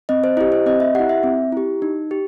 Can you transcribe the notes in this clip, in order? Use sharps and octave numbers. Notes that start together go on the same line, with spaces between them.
C4 D#5
C5
E4 G4 D#5
C5
C4 D#5
E5
E4 G4 F#5
E5
C4
E4 G4
D#4
G4